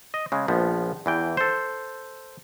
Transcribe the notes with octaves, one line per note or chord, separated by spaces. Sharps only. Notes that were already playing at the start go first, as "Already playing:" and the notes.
D#5
C#3 G#3
A#1 F3 B3
E2 E3 G5
A4 C5